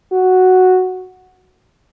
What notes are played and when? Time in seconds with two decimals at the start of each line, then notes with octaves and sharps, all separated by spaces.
0.12 F#4